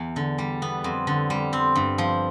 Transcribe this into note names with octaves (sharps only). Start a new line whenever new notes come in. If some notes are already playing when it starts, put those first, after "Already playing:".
Already playing: E2
D3
G3
B3
F2
D3
G3
C4
G2
F3